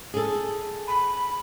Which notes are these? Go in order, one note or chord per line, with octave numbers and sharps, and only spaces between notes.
G#4 A4
B5